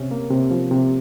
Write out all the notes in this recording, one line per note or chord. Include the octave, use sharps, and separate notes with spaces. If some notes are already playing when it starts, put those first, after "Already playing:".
Already playing: C3 C#4
A#3
C3
F3
C3